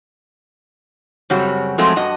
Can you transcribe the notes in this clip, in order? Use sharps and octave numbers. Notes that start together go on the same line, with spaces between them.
F#2 C#3 G3 C4 F#4 C#5
F3 F#3 G#3 A3 C4
G2 F#4 D#5